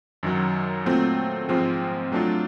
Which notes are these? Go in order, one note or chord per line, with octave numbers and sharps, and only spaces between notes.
F#2 D#3 F#3
A#2 F#3 A3 C4 F4
G#2 F3 G#3 C4 F4
F#3 A3 D4 F4